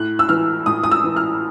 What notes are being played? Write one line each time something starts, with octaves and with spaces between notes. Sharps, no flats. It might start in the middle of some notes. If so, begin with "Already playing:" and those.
Already playing: A2 F#6
E6
E3 F6
A2 D#6
D#6
E6
E3
F6